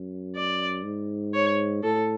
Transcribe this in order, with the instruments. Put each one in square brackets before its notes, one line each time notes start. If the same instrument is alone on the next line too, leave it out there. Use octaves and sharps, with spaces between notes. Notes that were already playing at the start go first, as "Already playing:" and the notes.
Already playing: [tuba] F#2
[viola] D5
[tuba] G#2
[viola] C#5
[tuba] A2 [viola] A4